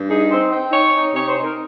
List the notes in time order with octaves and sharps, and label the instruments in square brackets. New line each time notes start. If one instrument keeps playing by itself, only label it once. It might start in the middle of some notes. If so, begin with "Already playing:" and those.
Already playing: [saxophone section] G2
D#4 G#4
C4 C5
C4
D#4 C#5
D#4
C3 C#5
C5
D#4
A#4